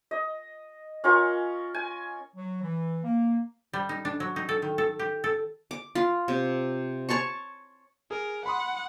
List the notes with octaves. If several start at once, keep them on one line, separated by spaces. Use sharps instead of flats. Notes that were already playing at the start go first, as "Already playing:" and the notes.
D#5
C#4 F4 A#4 C#5
G#5
F#3
E3
A#3
G3
D#4
D4
F#3
D#4
A4
D#3
A4
G4
A4
D6
F4
C3
C#5 A5 C6 C#6
G#4 A#4
F#5 B5 C6 D#6